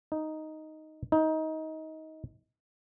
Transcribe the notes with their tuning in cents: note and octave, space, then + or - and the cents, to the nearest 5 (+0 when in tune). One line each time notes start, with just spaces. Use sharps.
D#4 +0
D#4 +20